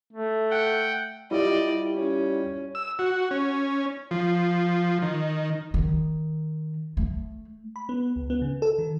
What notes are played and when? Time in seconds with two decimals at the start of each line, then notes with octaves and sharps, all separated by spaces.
0.13 A3
0.50 F#5 G5
1.31 G3 E4 F4 G4 D5 D#5
1.93 C#4
2.75 E6
2.99 F#4
3.31 C#4
4.11 F3
5.02 D#3
5.74 D#3
6.97 A3
7.76 B5
7.89 B3
8.16 C#2
8.30 B3
8.42 C#3
8.62 A4
8.79 D#3